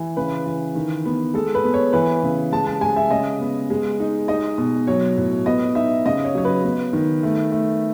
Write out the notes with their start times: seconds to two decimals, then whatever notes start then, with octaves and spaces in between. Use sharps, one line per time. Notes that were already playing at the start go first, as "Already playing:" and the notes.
Already playing: E3
0.17 C#3 B4
0.46 E3
0.75 D#3
1.05 B3
1.34 G#3 A4
1.55 B4
1.63 B3
1.74 C#5
1.93 E3 B4
2.23 C#3
2.52 G#3 A5
2.67 A5
2.81 G#3 G#5
2.96 E5
3.10 C#3 D#5
3.40 B3
3.70 G#3
4.00 D#4
4.28 D#4 D#5
4.58 B2
4.87 F#3 C#5
5.18 A2
5.46 B3 D#5
5.75 D#4 E5
6.06 C#3 D#5
6.25 C#5
6.35 F#3 C#5
6.45 B4
6.64 B3
6.93 D#3
7.23 A3
7.52 A3